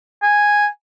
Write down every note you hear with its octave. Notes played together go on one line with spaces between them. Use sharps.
G#5